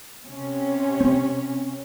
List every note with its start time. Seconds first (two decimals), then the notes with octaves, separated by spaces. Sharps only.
0.25 C3 C#4
1.00 C4